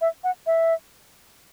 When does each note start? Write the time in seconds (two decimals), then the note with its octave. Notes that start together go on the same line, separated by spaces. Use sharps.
0.01 E5
0.24 F#5
0.47 E5